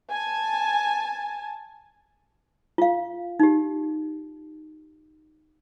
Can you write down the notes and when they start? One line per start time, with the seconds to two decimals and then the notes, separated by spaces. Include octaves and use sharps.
0.11 G#5 A5
2.78 F4 F5
3.40 D#4 G4